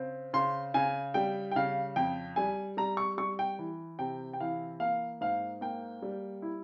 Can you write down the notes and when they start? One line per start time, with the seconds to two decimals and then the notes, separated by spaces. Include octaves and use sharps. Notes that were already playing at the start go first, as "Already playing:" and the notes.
Already playing: C#3 C4
0.34 C#3 C6
0.74 C#3 G#5
1.14 G3 G5
1.51 G5
1.56 C#3 F5
1.96 F2 G5
2.36 G3 G#5
2.77 G3 A#5
2.97 C#6
3.18 G3 C#6
3.39 G5
3.59 E3
3.99 C3 G5
4.33 G5
4.40 E3 F5
4.80 A#3 F5
5.21 G#2 F5
5.61 A#3 G5
6.02 G3
6.42 E4